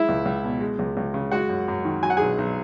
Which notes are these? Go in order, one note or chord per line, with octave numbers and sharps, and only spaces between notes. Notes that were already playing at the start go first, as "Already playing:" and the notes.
Already playing: G#3 E4 E5
C#2
C#2
B2
G#3
C#2
C#2
C#3
G#3 F#4 F#5
F#2
F#2
D#3
F#3 G#5
F#5
B1 G#4 G#5
B1